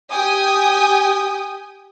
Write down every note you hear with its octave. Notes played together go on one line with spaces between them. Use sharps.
G4 G5 G#5 D#6